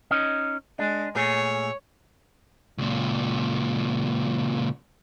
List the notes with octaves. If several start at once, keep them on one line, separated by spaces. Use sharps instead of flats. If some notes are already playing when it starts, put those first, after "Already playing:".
C#4 D#4 D#5
G#3 D4
A#2 A3 G#4 C#5
C#2 A#2